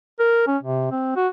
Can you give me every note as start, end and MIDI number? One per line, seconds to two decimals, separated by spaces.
0.19 0.47 70
0.47 0.57 61
0.63 0.87 48
0.91 1.13 60
1.16 1.28 66